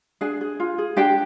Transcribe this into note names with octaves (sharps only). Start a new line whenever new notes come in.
D4 G#4 G#5
G#4
F4
G#4
D4 G4 G5